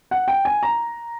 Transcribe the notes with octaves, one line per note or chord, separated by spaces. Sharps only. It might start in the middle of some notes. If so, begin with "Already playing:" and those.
F#5
G5
G#5
A#5